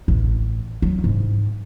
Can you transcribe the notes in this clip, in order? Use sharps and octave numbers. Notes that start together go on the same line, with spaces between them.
A1
F#3
G#2